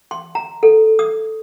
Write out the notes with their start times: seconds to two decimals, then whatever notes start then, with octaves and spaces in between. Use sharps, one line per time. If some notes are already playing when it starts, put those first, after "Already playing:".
0.11 C6
0.35 A#5
0.63 A4
0.99 D#6